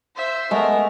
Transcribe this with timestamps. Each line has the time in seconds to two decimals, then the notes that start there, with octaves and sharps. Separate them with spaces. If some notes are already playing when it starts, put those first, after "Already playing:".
0.16 C5 E5
0.51 G#3 A3 B3 A#4